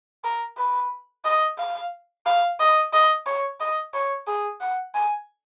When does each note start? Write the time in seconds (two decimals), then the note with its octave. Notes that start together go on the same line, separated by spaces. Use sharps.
0.24 A#4
0.57 B4
1.25 D#5
1.59 F5
2.26 F5
2.60 D#5
2.93 D#5
3.27 C#5
3.60 D#5
3.94 C#5
4.27 G#4
4.61 F#5
4.95 G#5